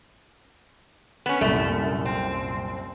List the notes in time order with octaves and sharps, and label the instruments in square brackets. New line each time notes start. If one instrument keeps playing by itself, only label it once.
[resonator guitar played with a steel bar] B3 C#4
[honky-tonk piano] C2 F#2 A#2 [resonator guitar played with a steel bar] A3
[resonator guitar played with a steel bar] C4